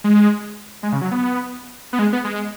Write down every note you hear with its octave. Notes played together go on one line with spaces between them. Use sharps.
G#3
G#3
C#3
F#3
B3
B3
G#3
B3
G#3